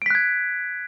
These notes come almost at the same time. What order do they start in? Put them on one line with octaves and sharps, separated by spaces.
D7 B6 F#6 G#6